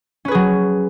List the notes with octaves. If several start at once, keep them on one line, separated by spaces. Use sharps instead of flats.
F#3 C#4 G#4 B4